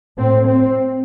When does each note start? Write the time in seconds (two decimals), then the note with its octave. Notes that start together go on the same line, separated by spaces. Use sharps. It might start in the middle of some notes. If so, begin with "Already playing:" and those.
0.18 A2 C4
0.47 C4